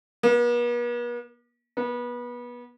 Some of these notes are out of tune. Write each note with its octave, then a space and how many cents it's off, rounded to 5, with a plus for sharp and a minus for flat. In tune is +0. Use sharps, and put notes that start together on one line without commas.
B3 -45
B3 -25